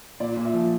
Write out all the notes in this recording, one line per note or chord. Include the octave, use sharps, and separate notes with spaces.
A#2 D5
A#2
E5
F3